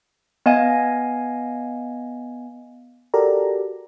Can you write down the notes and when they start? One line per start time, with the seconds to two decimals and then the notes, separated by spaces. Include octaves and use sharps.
0.46 B3 D#5 F5 G#5 G#6
3.14 F#4 G4 A4 A#4 D5 A#5